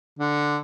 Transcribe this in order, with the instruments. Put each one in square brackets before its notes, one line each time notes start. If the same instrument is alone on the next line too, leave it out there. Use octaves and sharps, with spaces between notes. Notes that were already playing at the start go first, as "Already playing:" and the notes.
[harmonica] D3